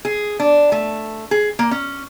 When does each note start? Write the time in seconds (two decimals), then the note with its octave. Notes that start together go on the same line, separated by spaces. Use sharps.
0.05 G#4
0.40 D4
0.72 A3
1.31 G#4
1.59 A#3
1.71 C#4